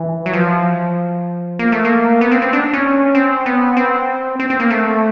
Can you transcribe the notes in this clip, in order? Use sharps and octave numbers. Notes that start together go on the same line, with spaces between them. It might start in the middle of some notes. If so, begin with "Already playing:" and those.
Already playing: E3
F#3
F3
A#3
A3
A#3
B3
C4
C4
D4
C#4
C4
B3
C4
C4
C4
A#3
A3